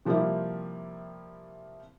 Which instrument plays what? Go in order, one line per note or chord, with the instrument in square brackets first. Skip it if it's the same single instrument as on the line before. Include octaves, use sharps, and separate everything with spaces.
[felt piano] C3 F3 G3 A#3 C4 E4